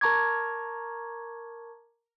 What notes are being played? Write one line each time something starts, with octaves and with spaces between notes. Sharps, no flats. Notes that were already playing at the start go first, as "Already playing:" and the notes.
A#4 A5 A#5 C#6 D6 G#6